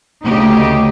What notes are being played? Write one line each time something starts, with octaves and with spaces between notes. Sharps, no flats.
D2 C#3 A3 D#4 G4 D#5